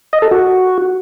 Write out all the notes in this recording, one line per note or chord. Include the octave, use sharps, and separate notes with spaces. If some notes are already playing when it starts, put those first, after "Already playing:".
D#5
A4
F#4